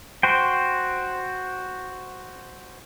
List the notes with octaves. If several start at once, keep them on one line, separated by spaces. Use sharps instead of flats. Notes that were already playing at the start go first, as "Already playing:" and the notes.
F#4 C5 G5